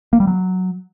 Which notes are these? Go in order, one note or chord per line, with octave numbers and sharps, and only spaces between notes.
A#3
G3
F#3